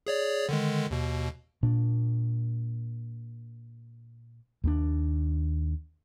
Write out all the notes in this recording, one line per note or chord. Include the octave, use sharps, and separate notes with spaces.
G#4 C#5 D5
D3 D#3 G#3
D#2 B2
A#2 D4
D#2 G#3 D4